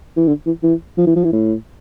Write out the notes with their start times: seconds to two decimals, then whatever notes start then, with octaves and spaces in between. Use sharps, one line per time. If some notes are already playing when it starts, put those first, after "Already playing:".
0.17 E3
0.28 D3
0.46 E3
0.63 E3
0.98 F3
1.07 E3
1.16 F3
1.24 E3
1.33 A2